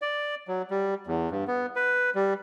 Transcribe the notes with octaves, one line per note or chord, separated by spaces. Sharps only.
D5
F#3
G3
E2
G2
B3
B4
G3